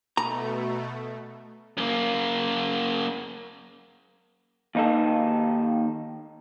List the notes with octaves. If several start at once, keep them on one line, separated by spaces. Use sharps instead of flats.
B2 A3 A#5
F#2 A#3
D#2 D#4 A4